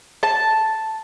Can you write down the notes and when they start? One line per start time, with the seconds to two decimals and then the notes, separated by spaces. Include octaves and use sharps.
0.23 A5